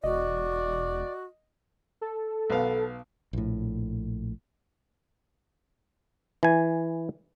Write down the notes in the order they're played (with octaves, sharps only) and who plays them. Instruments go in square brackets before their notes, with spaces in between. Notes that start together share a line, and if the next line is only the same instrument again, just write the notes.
[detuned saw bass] E1 [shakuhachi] F#4 [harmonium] D5 [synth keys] D#5
[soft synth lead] A4
[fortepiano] B1 B3 F5
[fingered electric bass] A#1 A2
[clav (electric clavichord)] E3 G#5